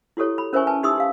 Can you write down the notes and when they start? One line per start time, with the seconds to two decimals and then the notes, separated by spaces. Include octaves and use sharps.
0.17 E4 F#4 G4 A4 C#5
0.38 B5
0.53 C#4 A#4 C5 E5 G#5 C#6
0.67 B4 G#5 A5
0.83 D#4 G4 E5 C6 D#6 E6
0.98 G4 F5